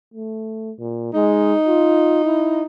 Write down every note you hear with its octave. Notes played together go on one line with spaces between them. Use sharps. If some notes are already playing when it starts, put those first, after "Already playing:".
A3
A#2
G#3 D#4
F4
E4